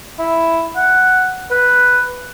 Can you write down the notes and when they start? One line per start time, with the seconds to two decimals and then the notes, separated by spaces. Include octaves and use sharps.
0.19 E4
0.76 F#5
1.51 B4